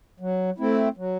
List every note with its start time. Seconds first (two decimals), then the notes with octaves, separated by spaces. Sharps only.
0.20 F#3
0.58 A3 C4 E4
0.97 F#3